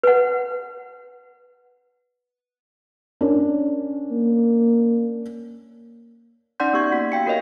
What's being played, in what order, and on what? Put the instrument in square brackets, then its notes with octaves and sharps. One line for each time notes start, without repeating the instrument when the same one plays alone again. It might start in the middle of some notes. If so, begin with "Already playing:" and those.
[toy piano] B4 F#5
[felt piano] C#4 D4 A#4
[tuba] A#3
[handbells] C#4 D#4 D5 F#5 C6 G6
B3 G4 C#6 G#6
A#3 F#4 B6
F5 G5 C#7
F#4 A#4 C#5 D#5 F5